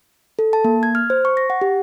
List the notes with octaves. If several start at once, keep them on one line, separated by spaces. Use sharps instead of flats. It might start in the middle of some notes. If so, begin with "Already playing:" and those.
A4
A5
A#3
G#6
F6
C5
C#6
A#6
F#5
G4